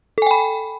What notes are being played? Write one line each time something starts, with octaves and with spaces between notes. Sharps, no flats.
A4 G5 G#5 B5